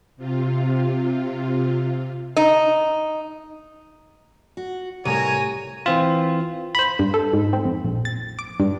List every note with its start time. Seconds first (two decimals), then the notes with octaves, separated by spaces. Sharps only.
0.17 C3 F4
2.37 D#4
4.57 F#4
5.05 C2 A2 A#4 C#5 G#5 A#5 D#7
5.86 E3 C4 F4
6.75 C5 B5
6.99 G2
7.14 A4
7.33 G#2
7.53 C4
7.65 F2
7.85 A#1
8.05 A6
8.39 D6
8.60 G2